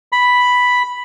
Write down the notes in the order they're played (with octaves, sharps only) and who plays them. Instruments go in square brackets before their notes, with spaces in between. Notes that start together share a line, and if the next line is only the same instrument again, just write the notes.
[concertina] B5